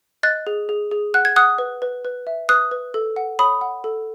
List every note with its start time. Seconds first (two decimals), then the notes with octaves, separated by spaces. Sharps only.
0.23 D#5 F#6 A6
0.47 G#4
0.69 G#4
0.91 G#4
1.14 F#5 F#6
1.25 G#6
1.36 F#5 D#6 F#6
1.58 B4
1.82 B4
2.05 B4
2.27 E5
2.49 B4 D#6 F#6
2.71 B4
2.94 A4
3.16 F#5
3.39 C#5 B5 D#6
3.61 F#5
3.84 A4